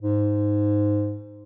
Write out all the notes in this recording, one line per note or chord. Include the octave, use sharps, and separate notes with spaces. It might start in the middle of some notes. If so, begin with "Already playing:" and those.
G#2